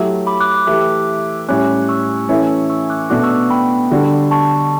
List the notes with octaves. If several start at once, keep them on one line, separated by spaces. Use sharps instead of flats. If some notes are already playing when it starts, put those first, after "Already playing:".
Already playing: F#3 A3 E4 G4
B5 D6
D6 F#6
D6 F#6
E3 A3 E4 G4
A2 G3 C#4 D6 F#6
F#6
C#6 E6
E3 A3 C#4 E4
C#6 E6
D6 F#6
B2 A3 D4 F#4 D6 F#6
C#6 E6
G5 B5
D3 G3 D4 F#4
A5 C#6